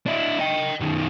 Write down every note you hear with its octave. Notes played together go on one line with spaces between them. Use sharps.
D4 E4
D#5 G5
F#2 D#3